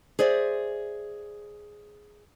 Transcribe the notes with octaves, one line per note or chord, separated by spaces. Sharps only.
G#4 C5 D5 E5